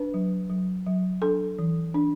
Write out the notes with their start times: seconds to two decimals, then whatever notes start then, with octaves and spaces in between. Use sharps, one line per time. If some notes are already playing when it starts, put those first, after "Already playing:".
Already playing: D4 B4
0.14 F#3
0.50 F#3
0.87 F#3
1.22 D4 A4
1.59 E3
1.94 D4